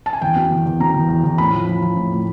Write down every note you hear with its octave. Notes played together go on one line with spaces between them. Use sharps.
A5
G#5
E2 G5
B2
E2
E2
B2 A#5
E2
E2
E2
A2 B5
F3
F3
F3
A2
A2